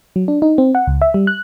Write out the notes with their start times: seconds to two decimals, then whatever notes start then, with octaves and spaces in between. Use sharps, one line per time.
0.16 F#3
0.28 D4
0.42 D#4
0.58 C4
0.75 F#5
0.87 C#2
1.02 E5
1.14 G3
1.27 F#6